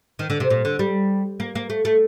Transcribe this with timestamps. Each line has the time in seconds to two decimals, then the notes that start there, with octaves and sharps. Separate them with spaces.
0.19 D#3
0.30 D3
0.40 C3
0.50 A#2
0.65 D3
0.79 G3
1.40 A#3
1.55 A#3
1.70 A3
1.85 A3